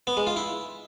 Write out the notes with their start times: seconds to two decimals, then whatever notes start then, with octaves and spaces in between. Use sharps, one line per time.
0.07 B3
0.17 G#3
0.27 F4
0.36 E4